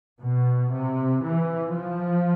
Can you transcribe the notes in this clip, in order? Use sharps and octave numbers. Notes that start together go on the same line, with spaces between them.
B2
C3
E3
F3